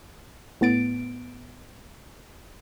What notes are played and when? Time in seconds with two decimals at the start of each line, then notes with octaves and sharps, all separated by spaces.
0.61 A2 B3 A6 D7